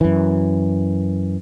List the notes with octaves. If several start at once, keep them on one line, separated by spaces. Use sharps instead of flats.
F#2 E3